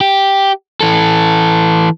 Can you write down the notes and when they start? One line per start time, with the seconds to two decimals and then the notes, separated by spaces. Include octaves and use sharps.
0.01 G4
0.81 E3 A4